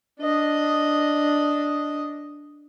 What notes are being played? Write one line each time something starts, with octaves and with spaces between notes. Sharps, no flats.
D4 D#5